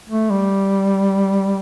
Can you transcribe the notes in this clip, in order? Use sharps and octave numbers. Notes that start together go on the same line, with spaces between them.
A3
G3